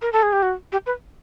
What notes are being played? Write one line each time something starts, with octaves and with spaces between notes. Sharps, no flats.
A#4
A4
G#4
G4
F#4
G4
B4